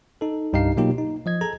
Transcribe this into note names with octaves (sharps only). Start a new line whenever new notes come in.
D#4 A4
C2 G2 D#4 G4 F5 C7
B2 F#3 A#3 D#4 F4 G4
D#4
F3 D#5 G#6
G#4 A4 A#5 G#6